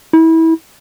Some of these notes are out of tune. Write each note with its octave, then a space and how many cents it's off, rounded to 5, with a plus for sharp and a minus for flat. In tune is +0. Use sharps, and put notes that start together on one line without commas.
E4 -25